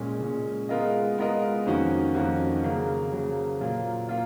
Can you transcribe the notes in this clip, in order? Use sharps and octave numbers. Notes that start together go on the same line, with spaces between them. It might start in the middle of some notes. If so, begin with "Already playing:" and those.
Already playing: A#2 G#3 C#4
A#2 G#3 C#4
G#3 B3 F4 A#4 D#5
G#3 B3 F4 A#4 D#5
F2 D#3 A#3 C#4 F#4
F2 D#3 A#3 C#4 F#4
C#3 F#3 A#3
C#3 F#3 A#3
A#2 F#3 A#3 F4
A#3 F4